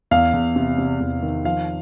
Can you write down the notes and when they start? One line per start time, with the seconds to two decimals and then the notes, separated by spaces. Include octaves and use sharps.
0.11 E2 F5
0.33 E2
0.56 C3
0.78 C3
1.00 E2
1.22 D#3
1.45 F3 F5